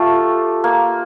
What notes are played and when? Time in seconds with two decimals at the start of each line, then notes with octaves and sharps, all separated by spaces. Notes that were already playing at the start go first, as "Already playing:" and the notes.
Already playing: A3 F4 G4 A4
0.64 A#3